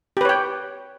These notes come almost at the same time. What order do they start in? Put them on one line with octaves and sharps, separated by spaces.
G4 B4 C#5 G5